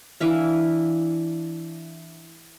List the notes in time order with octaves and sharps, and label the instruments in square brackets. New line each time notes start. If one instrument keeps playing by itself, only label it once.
[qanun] E3 D4 E5 F5